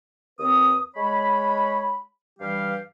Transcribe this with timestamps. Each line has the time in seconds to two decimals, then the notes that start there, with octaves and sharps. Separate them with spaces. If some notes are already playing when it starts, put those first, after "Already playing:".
0.40 D#2 C4 B4 D#6
0.96 G#3 C#5 B5
2.40 G2 E3 G3 G4 F5